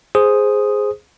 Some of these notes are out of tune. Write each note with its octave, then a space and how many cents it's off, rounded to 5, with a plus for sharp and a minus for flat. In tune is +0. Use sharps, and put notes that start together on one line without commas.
G#4 +0 C5 +0 D#6 +0